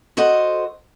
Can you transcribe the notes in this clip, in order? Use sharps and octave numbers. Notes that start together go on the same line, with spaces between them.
F#4 A4 C5 D#5 F#5